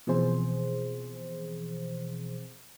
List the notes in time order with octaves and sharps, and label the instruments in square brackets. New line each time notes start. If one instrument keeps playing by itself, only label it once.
[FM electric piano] B2 E3 F3 C4 G#4 C5